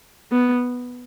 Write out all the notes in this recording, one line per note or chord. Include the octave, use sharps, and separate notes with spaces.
B3